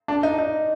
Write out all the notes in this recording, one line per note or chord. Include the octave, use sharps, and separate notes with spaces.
D4
D#4
D#4